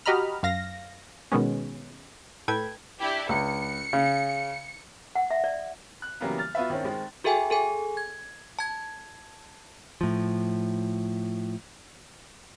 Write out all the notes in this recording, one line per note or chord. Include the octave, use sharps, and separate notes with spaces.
F#4 G4 D#5 A#5 B5 F6
F#2 F5 A#6
B2 D#3 G#3 B3 C#4
A2 A4 B4 G5 G#6
D4 E4 G4
C#2 C#7
C#3
F#5
E5
D5
F#6
C#3 E3 F#3 G3 A#3 B3
F6 A6
B3 F4 F#4 B4 E5
D#3 C4 C#4 E4
D#3 G#3 C4
F#4 G#4 A4 E5 G5 G#5
G#4 A4 G#5
G#6
A5 G#6
A2 F3